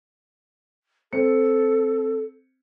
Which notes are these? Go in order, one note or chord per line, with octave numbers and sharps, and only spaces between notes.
C4 A4 C#7